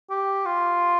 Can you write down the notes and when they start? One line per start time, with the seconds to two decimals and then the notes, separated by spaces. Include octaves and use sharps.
0.10 G4
0.45 F4